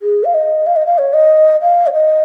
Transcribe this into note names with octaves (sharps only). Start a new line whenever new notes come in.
G#4
F5
D#5
F5
D#5
F5
C#5
D#5
F5
C#5
D#5